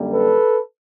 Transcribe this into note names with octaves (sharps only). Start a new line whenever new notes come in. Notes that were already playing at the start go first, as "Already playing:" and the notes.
Already playing: F#2 D3 G3 A#3
A4 B4